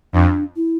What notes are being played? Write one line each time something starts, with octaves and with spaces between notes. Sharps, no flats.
F2 D4
E4